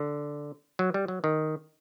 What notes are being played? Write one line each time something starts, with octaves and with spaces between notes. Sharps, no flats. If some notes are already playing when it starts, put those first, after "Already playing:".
Already playing: D3
F#3
G3
F#3
D#3